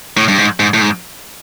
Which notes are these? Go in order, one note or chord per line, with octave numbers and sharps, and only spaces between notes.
A2
G2
G#2
G#2
A2
G#2